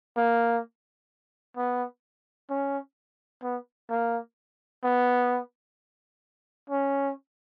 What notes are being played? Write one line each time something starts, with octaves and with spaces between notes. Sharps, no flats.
A#3
B3
C#4
B3
A#3
B3
C#4